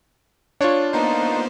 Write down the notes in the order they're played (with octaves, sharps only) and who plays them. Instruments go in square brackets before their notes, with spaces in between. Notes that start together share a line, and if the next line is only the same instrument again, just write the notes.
[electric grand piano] D4 F4 [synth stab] C#5
[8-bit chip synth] A#3 B3 C5 [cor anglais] D#4